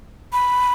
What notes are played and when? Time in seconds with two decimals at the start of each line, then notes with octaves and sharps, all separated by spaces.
0.33 B5